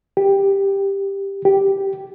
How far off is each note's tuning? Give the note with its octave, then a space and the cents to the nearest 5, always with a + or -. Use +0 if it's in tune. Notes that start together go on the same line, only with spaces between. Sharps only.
G4 +10
G4 +0